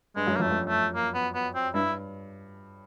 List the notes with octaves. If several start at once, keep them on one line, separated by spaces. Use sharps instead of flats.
G2 G#3
F#2
A#3
F2 A3
F#2
A3
A#3
B3
B3
C4
G2 E4